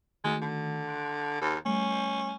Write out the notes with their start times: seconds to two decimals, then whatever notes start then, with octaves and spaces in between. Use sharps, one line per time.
0.24 D#3 G#3 A3 F#4
0.42 D3
0.87 C6 F#6 D7
1.41 D#2
1.65 G3 A3 C#4